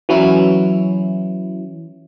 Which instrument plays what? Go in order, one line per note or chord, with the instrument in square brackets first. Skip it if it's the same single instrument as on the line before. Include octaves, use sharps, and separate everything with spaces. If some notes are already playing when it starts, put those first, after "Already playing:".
[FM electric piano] E3 F#3 C#4 E4